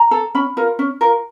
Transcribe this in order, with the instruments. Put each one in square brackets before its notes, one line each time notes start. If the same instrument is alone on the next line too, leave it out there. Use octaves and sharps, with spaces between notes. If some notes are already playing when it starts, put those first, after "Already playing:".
Already playing: [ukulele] A#5
A4
C#4 B5
F4 A#4
C#4
F4 A#4